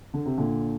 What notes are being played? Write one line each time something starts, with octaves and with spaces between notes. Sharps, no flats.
D3
C3
A#2 D3